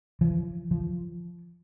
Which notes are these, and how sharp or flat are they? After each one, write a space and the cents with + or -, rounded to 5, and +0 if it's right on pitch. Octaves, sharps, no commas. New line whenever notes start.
F3 -40
F3 -15